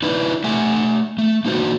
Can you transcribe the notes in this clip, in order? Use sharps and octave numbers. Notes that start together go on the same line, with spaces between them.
D#4 E4 B4 D5
A3 G4 E5 F#5 G#5
A3
A#3 D#4 F#4 C5